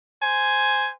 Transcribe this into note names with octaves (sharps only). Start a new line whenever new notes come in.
C5 G#5